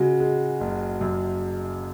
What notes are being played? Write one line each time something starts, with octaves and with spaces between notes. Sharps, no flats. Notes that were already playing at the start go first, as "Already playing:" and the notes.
Already playing: C#3 G#3 F#4
G#3
F#1
F#2